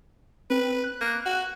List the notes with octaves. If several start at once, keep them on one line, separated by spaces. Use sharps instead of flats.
C4 B4
F#6
A#3
F#4